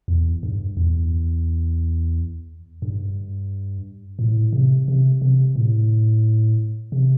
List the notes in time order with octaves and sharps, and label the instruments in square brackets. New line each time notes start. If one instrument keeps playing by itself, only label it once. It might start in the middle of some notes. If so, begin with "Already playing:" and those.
[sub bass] E2
G2
E2
G2
A2
C3
C3
C3
A2
C3